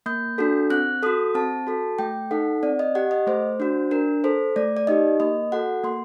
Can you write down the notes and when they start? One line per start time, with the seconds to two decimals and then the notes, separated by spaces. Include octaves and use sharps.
0.06 A#3 G6
0.38 D4 F#4 A4
0.70 C4 F#6
1.03 F#4 A4 D#6
1.34 C4 A5
1.67 F#4 A4
1.99 A3 G5
2.31 D#4 A4 F#5
2.63 C4 D5
2.79 D#5
2.95 G4 F#5
3.11 D#5
3.27 A3 C5
3.60 D4 F#4
3.91 D4 A#4
4.24 A4 C5
4.56 A3 D5
4.77 D5
4.87 D#4 G4 D#5
5.20 A#3 D#5
5.52 F#4 A4 F#5
5.84 A#3 C6